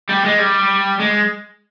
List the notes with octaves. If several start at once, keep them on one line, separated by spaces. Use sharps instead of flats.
G3
G#3
G3
G#3